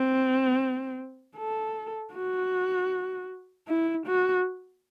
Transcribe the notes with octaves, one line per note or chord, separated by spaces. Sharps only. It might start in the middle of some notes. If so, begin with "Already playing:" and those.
Already playing: C4
A4
F#4
E4
F#4